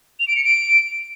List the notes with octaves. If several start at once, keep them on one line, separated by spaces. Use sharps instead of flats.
F7
D7
C#7
D7